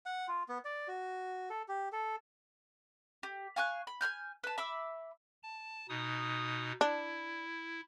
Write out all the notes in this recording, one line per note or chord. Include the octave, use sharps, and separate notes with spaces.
F#5
F4
B3
D5
F#4
A4
G4
A4
G4
F5 G#5 C#6 F#6
B5
G#5 B5 F6 G6
B4 A5
E5 B5 D6 E6
A5
B2 D#4 D#6
D4 E4